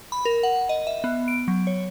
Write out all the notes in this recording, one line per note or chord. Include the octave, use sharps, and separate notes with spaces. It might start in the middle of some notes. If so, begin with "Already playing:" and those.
B5
A#4
F#5
D#5
E5
B3
D7
F#3
C#5